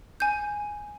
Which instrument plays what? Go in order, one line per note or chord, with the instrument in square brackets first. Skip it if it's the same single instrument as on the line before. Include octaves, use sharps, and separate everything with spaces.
[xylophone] G#5 G6